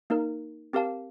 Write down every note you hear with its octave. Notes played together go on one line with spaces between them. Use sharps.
A#3 D#4 A#4
C4 G4 A#4 F5 A5